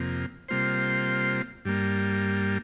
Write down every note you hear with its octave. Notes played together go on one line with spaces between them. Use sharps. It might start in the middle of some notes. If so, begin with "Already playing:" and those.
Already playing: F2 C3 A#3
C3 G3 A#3 F4 C5
G2 G3 A#3